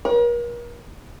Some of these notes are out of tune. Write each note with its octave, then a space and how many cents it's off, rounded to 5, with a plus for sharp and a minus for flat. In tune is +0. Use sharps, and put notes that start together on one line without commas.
A#4 +40 C#5 -15